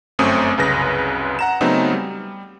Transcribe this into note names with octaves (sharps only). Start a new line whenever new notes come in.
G1 F#2 A3 C4 C#4 D#6
C2 F#2 C#3 B4 A#6
F#5 A#5 E7
C#3 F#3 A3 B3 C4 D#4
G3